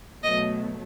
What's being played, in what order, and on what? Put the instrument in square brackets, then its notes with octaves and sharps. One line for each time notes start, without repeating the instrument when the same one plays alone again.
[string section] B2 F#3 A3 [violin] D#5